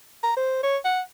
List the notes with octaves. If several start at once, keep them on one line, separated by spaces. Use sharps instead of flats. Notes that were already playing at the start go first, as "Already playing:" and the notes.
A#5
C5
C#5
F#5